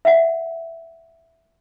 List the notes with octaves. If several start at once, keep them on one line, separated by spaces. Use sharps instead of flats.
E5 F#5